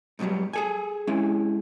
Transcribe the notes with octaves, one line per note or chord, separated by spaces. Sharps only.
G#2 B2 E3 F#3 G3
G#4 A4 G#5
G#3 C#4 E4